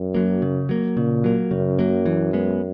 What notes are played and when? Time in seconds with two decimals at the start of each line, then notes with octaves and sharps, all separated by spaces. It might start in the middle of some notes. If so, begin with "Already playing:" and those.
Already playing: F#2
0.14 F#3 A#3
0.42 C#3
0.69 F#3 A#3
0.97 A#2 C#3
1.24 F#3 A#3
1.51 F#2 C#3
1.79 F#3 A#3
2.06 E3
2.33 G#3 B3